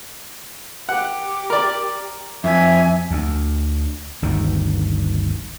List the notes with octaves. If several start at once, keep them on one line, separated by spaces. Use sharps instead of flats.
G4 F#5
A#4 D5
F2 E5 G#5
D2
G1 D2 D#3